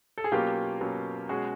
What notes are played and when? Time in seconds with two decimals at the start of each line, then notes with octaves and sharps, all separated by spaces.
0.18 A4
0.24 G#4
0.32 B2 F#3 A#3 C#4 F4 G4
0.81 B2 F#3 A#3 C#4
1.29 B2 G#3 C#4 F#4 G#4